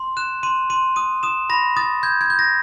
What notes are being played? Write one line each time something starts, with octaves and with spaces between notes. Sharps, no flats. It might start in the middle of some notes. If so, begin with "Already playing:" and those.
Already playing: C6
F#6 E7
C6 D#7
C6 D#7
D#6 D#7
D#6 E7
B5 A#6
D#6 A6
G6 G#6
G#6
G6
A#6